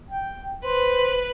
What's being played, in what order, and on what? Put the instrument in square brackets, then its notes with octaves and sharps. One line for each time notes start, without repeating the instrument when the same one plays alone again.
[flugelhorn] G5
[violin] B4 [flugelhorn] C5